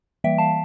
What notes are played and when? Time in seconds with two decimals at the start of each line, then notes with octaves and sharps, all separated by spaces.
0.24 E3 G3 A#3 E5 G5
0.38 F5 A5